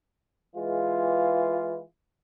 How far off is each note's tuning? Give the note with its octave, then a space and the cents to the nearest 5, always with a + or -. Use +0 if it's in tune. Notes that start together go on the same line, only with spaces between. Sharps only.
E3 +0 G#3 +0 F4 +0